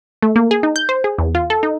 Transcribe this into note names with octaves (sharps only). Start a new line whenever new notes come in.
A3
A#3
G#4
D#4
G6
C5
G#4
E2
F4
A4
D#4